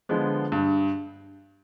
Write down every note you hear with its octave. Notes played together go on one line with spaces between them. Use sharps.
D3 F3 G#3 B3
G2